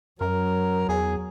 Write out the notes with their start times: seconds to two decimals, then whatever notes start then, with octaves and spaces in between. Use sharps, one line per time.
0.21 F#2 F#3 A#4
0.89 E2 G#4